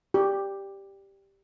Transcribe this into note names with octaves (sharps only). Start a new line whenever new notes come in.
G4